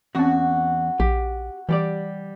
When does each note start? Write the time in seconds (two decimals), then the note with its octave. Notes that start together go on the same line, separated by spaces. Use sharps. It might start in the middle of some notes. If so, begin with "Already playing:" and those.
0.15 E2 C4 C#4 F#4
1.00 A#1 G4
1.69 E3 G3 G4 D5